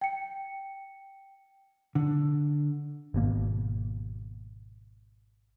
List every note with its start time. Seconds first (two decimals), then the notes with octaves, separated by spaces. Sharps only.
0.01 G5 C#7
1.95 D3
3.14 G#1 B2 A#3